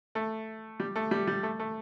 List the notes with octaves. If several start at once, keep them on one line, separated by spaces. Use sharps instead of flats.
A3
G3
A3
G3
G3
A3
A3